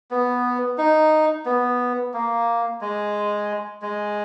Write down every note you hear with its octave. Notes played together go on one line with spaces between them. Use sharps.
B3
D#4
B3
A#3
G#3
G#3